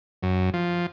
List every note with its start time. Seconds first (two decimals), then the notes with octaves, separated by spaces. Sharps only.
0.23 F#2
0.54 F3